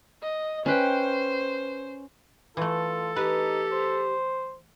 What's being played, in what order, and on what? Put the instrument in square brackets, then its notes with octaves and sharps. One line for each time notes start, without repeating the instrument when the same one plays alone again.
[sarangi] D#5
[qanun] C#4 B4 G5 [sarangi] C5
[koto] E3 A3 [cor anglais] F4 [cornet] A4
[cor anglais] D#4 [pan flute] G4 [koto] B4
[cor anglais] C5